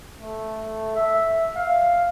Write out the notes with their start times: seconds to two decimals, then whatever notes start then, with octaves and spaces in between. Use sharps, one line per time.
0.21 A3
0.95 E5
1.56 F5